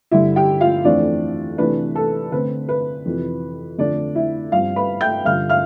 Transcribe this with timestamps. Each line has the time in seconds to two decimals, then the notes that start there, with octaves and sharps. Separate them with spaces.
0.11 G2 D3 G3 E4 E5
0.36 G4 G5
0.60 F4 F5
0.85 F2 E3 A3 C4 D4 D5
1.58 C3 E3 A3 D4 B4
1.96 A4
2.32 D3 A3 C4 B4
2.69 B4
3.05 F2 C3 E3
3.78 F2 D3 A3 D4 D5
4.15 E4 E5
4.52 G2 F3 C4 F4 F5
4.76 B4 B5
5.01 G5 G6
5.25 G2 D3 F3 F5 F6
5.49 F5 F6